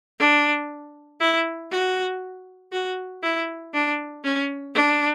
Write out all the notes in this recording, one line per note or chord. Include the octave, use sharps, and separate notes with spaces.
D4
E4
F#4
F#4
E4
D4
C#4
D4